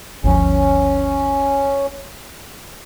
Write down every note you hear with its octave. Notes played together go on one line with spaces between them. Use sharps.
G1 D2 F3 C#4